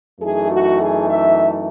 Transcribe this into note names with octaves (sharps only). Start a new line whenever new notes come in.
F#2 E3 A3 D#4 G#4
F#4
G#4
E5